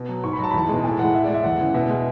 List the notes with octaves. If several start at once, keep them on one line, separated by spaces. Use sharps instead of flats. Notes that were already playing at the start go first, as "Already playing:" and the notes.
Already playing: B2
F#3
G#2 C#6
B5
F#3 A5
B5
E2 A5
B2 G#3
A2 G#5
E3 G#3 F#5
A2 E5
D5
G#3
E5
E2 F#5
C#3 E3
B2 E5
G#3